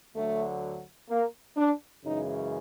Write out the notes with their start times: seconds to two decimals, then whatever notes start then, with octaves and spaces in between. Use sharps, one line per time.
0.15 D2 D3 F#3 A3
1.10 A#3
1.56 D4
2.05 F#2 C#3 E3 G#3 D#4